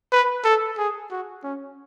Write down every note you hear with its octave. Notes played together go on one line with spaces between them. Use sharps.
B4
A4
G#4
F#4
C#4